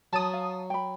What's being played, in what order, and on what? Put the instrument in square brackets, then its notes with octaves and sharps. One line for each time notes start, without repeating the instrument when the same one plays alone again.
[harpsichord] F#3 [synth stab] A5 D#6
[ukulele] F5
G5 B5